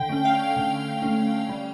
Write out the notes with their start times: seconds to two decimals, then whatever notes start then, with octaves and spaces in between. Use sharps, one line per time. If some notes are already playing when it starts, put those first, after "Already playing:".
Already playing: D3 G5
0.09 A3 C#4
0.25 F5
0.56 D3
1.02 A3 C#4
1.49 G3